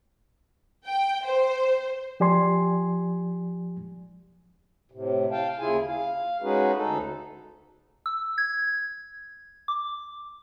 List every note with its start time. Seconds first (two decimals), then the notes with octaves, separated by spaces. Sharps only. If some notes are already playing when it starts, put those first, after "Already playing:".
0.85 G5
1.25 C5
2.20 F3 G4 D5 G#5 C6
4.92 A2 C3
5.31 F5 G5 A5
5.59 D#2 C#3 E4 F4 G#4 G#5
5.86 F5
6.42 G#3 C#4 D#4 F#4 G#4 B4
6.76 D2 D#4 A4
8.06 E6
8.38 G#6
9.68 D6